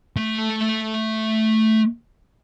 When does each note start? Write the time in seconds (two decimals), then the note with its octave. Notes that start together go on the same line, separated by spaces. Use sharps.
0.17 A3 E5